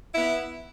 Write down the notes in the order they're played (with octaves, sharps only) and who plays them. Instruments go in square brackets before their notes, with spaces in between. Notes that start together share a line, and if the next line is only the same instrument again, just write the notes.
[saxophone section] B3 E4